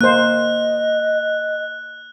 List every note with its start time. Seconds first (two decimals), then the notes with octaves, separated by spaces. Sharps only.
0.01 A#3 C5 D#5 F#6